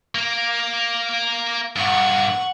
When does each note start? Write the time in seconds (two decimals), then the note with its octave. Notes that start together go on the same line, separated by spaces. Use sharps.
0.15 A#3
1.76 G2 A#2 F#5 C#6